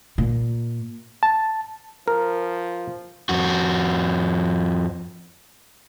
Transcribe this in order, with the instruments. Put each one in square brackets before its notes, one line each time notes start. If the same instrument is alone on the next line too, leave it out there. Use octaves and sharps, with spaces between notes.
[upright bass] A#2
[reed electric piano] A5
[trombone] F3 [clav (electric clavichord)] A#4
[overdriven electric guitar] F2 F#4